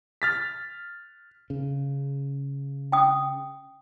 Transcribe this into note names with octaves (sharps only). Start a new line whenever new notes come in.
F6 A6 B6
C#3
G5 D#6